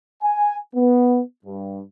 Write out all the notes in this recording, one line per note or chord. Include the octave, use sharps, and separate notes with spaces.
G#5
B3
G2